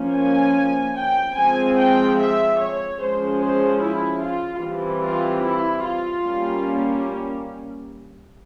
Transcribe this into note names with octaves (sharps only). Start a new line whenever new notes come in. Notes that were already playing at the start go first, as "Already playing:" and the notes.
Already playing: F3 A#3 C#4
G#5
G5
F3 G#3 C4 G#5
G5
E5
C#5
F3 G#3 C#4 C5
C5
E4
F4
E3 G3 C4
F4
E4
F4
G3 A#3 C#4